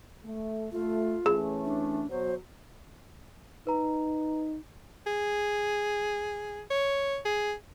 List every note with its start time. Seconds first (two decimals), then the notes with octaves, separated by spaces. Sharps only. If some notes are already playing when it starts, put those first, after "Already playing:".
0.25 A3
0.72 A3 F4
1.26 E3 A3 C#4 G#4
1.65 D4
2.10 B2 F#3 C5
3.67 D#4 B4 A#5
5.07 G#4
6.71 C#5
7.25 G#4